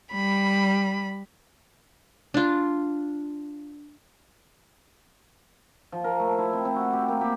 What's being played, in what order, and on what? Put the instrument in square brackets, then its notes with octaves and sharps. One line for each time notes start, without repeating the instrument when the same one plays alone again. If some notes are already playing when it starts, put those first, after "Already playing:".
[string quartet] G3 B5
[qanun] D4 F4
[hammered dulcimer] F3
A#4
A3
E4
C4
C4
F#4
G4
A#3
G4